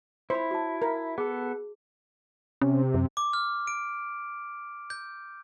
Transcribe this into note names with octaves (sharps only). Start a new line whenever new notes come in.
E4 C5 C#5 B5
F#4 A5
A#4
B3 G#4 A4
C3 C#4
F#2
D6
F6
D7
G6